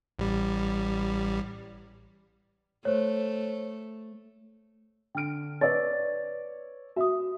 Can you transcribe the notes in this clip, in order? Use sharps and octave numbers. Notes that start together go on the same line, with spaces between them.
A1 G3
A3 C5 C#5
D3 G5 F6 D7
B4 C#5 D5 E6 A6
F#4 E5 D#6